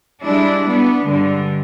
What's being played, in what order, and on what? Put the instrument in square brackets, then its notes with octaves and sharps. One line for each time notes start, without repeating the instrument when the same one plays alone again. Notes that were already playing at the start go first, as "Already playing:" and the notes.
[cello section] G3 G#3 D4 E4
B3 D4
G2 D3 G#3